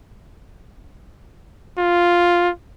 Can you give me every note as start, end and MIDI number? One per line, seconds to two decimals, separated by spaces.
1.78 2.50 65